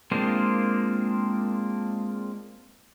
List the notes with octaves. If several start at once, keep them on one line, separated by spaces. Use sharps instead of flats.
G#3 A#3 C4 D4 F4